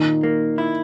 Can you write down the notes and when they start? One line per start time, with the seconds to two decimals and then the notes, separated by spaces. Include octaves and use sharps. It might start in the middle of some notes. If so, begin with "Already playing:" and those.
Already playing: A#2 D#3
0.23 A#3
0.58 E4